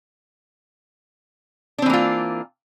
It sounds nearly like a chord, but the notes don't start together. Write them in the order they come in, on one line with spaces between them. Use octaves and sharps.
D4 C4 E3 A#3 F4